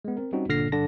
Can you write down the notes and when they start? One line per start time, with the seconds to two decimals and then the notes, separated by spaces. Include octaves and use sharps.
0.05 G#3 B3
0.17 C4 A#4
0.32 G3 C4 C#4 D#4 F#4
0.48 G1 A#2 D3 F6 A#6 C7
0.72 G2 D3 A5 A#6